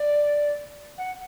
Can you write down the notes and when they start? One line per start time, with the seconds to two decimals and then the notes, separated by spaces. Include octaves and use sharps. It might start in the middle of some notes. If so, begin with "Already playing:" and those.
Already playing: D5
0.98 F#5